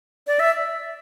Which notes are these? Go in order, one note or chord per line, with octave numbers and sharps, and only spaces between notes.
D5
E5